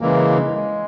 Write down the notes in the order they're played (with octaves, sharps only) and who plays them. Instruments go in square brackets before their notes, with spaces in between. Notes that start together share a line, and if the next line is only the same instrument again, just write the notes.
[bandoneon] C#3 E3 A#3 [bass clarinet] G#3
[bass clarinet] G#3